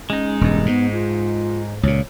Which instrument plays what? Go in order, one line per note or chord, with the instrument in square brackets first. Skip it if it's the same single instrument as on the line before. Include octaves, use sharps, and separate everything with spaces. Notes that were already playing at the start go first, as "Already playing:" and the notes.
[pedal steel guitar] G#3 D#4 [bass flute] C#4
[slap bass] E1 G2
[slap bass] G#2 [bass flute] B3
[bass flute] F4
[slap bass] C#2 A#2 [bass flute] C#5